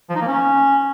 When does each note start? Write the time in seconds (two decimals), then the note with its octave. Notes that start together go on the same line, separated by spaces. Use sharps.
0.10 F3
0.15 D#4
0.21 A#3
0.27 C#4